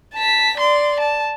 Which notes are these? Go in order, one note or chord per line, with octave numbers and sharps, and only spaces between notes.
A5 B6
D5 C6
A5